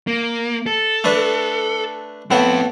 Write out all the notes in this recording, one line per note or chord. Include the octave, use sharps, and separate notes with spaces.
A#3
A4
A3 D4 B4
A2 B3 C4 A4 F5